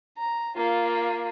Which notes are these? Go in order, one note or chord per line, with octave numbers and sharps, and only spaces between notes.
A#5
A#3 F4